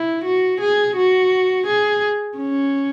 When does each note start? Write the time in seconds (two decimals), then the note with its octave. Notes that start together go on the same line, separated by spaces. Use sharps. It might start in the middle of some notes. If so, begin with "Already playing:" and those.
Already playing: E4
0.24 F#4
0.60 G#4
0.96 F#4
1.66 G#4
2.38 C#4